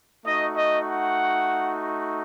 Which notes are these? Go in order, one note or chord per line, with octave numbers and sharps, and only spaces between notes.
A3 D#4 F#4 D#5
D#5
F#5